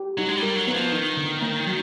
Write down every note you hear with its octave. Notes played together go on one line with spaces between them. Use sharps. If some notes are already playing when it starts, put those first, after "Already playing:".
Already playing: G4
F#3 D#4
G#3
G3
A#4
F#3
B3
F3
D#3 D#4
D3
A#3
F#3